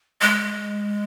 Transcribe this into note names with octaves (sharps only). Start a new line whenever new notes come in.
G#3